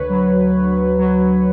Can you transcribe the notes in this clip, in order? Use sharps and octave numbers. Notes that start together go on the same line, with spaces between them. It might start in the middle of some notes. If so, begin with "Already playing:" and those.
Already playing: D2 B4 C#5
F#3
D2
F#3